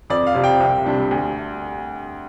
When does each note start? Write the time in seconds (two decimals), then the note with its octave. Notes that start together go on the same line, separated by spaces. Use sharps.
0.10 F2 D5
0.27 F5
0.35 C3 F3
0.44 G5
0.60 C2
0.86 C3 G3 D4
1.11 D2